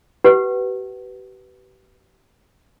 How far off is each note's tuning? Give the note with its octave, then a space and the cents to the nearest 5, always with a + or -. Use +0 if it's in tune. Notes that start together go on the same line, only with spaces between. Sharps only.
G4 -40 B4 +0 F#5 +35